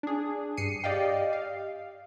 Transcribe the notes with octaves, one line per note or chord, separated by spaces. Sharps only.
D4 G#4
G2 C7 C#7 D#7
G4 D5 D#5 F5 G5
F5